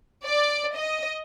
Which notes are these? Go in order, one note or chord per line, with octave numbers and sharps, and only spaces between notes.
D5
D#5